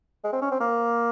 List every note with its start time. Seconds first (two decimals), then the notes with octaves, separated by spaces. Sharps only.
0.24 G#3
0.33 C4
0.42 C#4
0.51 C4
0.60 A#3